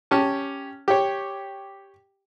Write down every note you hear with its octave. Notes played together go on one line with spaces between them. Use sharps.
C#4 G4 A5
G4 C#5